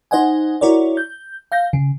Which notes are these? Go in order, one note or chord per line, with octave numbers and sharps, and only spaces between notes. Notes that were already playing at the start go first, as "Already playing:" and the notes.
D#4 C5 D#5 F#5 G#5
E4 F#4 A#4 C#5 D5
G6
F5 G6 A#6
C#3